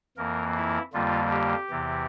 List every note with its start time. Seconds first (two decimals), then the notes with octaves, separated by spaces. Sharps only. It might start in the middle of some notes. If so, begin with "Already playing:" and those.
0.17 F2 E3 A#3 A#4
0.56 E4
0.93 F2 D3 G3 A#3 F4
1.31 G4
1.70 E2 C3 E3